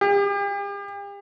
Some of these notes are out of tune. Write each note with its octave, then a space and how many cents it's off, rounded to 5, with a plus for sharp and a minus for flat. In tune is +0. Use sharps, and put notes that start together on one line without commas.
G4 +40